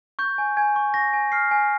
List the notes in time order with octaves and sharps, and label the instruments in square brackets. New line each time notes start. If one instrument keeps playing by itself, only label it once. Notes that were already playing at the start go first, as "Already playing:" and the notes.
[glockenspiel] C#6 G6
G#5
G#5 G#6
C#6
C#6 A#6
G#5
F6 C7
G#5